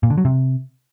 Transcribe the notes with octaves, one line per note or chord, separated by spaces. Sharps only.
A#2
D3
F#3
C3